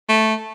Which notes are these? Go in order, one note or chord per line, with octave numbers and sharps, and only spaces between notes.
A3